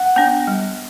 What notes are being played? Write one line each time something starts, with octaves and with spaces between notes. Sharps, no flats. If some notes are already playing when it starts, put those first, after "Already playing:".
Already playing: F#5
B3 D4
G3